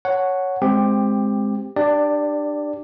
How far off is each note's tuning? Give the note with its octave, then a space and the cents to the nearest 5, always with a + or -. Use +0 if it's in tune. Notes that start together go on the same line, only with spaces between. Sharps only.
C#5 +0 F#5 +0 A5 +0
G#3 +0 C4 +0 G4 +15
D4 +25 G4 +15 D5 +0